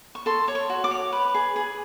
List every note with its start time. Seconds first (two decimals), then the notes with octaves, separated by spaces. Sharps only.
0.15 C#6
0.26 A4 C6
0.48 C#5 D6
0.55 C#6
0.70 F#4
0.84 D6
0.91 C#5
1.12 B4
1.34 G#4
1.56 G#4